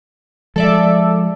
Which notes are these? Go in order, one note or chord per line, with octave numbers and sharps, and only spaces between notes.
F3 G#3 A4 D5 E5